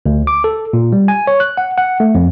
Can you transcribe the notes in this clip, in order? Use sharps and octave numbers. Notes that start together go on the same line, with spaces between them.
D2
D6
A4
A#2
G3
G#5
C#5
F#6
F#5
F#5
A3
F2